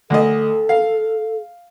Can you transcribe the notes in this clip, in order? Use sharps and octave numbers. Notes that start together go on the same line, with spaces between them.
D2 A4 D#5
F5